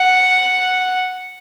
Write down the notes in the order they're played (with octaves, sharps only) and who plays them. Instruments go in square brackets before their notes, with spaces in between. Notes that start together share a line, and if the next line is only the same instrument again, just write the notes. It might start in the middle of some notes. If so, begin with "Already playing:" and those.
Already playing: [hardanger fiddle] F#5